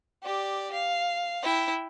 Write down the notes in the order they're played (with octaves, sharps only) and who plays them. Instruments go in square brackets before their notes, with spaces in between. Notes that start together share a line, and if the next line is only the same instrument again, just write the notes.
[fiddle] G4 D5
F5
E4 G5